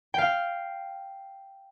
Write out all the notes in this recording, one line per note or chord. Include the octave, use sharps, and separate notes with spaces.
F5 G5